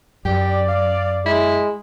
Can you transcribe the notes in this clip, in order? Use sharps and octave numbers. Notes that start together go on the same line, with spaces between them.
F#2 G4 D5
F5
G#3 E4